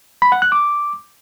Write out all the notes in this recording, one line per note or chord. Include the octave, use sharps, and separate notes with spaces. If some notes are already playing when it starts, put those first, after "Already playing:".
B5
F#5
F#6
D6